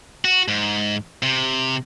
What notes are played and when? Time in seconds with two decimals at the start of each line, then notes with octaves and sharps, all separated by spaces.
0.25 F#4
0.48 G#2
1.23 C3